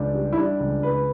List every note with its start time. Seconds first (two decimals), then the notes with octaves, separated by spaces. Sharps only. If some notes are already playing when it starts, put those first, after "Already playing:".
Already playing: C#2 D4
0.14 G3
0.33 E4
0.37 G3 D4
0.60 C#2
0.83 C#2 B4